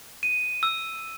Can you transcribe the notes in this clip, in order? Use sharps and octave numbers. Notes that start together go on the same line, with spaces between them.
D#7
E6